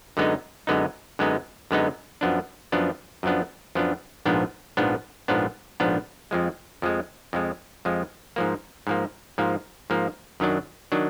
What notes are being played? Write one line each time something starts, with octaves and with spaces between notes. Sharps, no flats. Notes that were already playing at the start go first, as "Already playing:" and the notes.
F#2 D3 G#3 B3 D#4
F#2 D3 G#3 B3 D#4
F#2 D3 G#3 B3 D#4
F#2 D3 G#3 B3 D#4
F#2 F3 B3 D4
F#2 F3 B3 D4
F#2 F3 B3 D4
F#2 F3 B3 D4
A#1 G#2 F3 B3 D4
A#1 G#2 F3 B3 D4
A#1 G#2 F3 B3 D4
A#1 G#2 F3 B3 D4
F2 F3 G#3
F2 F3 G#3
F2 F3 G#3
F2 F3 G#3
G#2 F3 A#3
G#2 F3 A#3
G#2 F3 A#3
G#2 F3 A#3
F#2 D#3 F#3 D4
D#3 F#3 D4